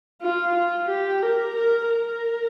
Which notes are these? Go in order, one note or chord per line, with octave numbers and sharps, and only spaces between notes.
F4
F4
G4
A#4
A#4
A#4